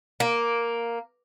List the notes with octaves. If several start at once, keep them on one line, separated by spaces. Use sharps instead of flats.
A#3